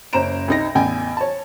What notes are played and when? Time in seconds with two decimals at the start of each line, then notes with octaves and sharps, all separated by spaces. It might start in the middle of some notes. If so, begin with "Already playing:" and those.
0.13 F#1 C#4 C5 A#5 D7 E7
0.48 C2 D#4 A#6
0.75 A1 E2 G5 G#5
1.17 C#5 A5